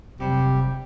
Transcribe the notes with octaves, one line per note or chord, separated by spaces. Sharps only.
F1 C3 F#3 G3 G4